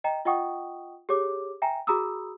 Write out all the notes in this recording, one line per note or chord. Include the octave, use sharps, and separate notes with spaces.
D#5 G5 A#5
F4 D#5 F#5 G5 C#6 D#6
G4 G#4 C#5 D6
E5 G5 G#5 A#5
F#4 G#4 A#5 B5 D#6 E6